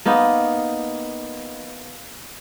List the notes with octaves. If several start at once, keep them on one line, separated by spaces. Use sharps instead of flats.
A#3 B3 D#4